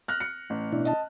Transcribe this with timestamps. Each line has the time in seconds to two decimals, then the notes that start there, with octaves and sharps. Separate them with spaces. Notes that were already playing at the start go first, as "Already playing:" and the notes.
0.08 F6 F#6 A#6
0.20 C#7
0.50 A1
0.73 B2 D4 E4
0.85 D#5 A5